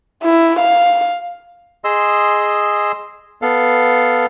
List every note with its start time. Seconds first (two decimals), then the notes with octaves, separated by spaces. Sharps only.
0.23 E4
0.59 F5
1.84 G#4 D#5 C6 E6
3.42 B3 A4 F5